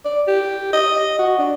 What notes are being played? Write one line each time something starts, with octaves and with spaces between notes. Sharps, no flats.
D5
G4
D#5
F#4
D4